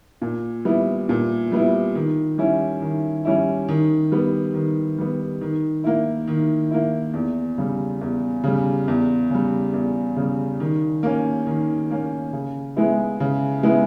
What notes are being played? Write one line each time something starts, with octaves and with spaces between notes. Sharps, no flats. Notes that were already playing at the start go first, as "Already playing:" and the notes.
A#2
G3 B3 E4
A#2
G3 B3 E4
D#3
G3 C#4 E4
D#3
G3 C#4 E4
D#3
G3 B3
D#3
G3 B3
D#3
A#3 E4
D#3
A#3 E4
E2
C#3 G3
E2
C#3 G3
E2
C#3 G3
E2
C#3 G3
D#3
A#3 C#4
D#3
A#3 C#4
C#3
G#3 B3 E4
C#3
G#3 B3 E4